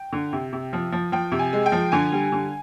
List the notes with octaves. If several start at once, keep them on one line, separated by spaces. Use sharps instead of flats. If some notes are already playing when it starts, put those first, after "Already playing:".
Already playing: G5
D3
C3
C3
F3
F3
F3 G5
C3
G#5
G#3
G5
F3
D3 G#5
G3
D3